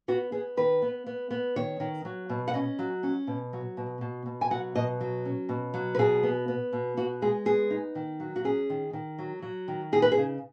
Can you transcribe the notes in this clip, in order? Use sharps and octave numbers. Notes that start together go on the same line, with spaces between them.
B3 F#4
B3 G#4
D#3 B4
B3
B3
B3
D#3 C#5
D#3
F#3
B2
F#5
C#4 D#5
F#3
C#4
B2
F#3
B2
B2
B2
G#5
F#3 F#5
B2 D#5
F#3
C#4
B2
F#3
B4
B2 G#4
B3
B3
B2
B3 F#4
G#3 G#4
B3 G#4
D#4
D#3
F#3
F#4
C#4 G#4
D#3
D#3
F#3
F#3
D#3
D#4 G#4
B4
G#4
C#3